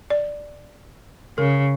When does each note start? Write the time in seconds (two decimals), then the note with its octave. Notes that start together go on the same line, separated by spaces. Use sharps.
0.10 D5
1.38 C#3 A#4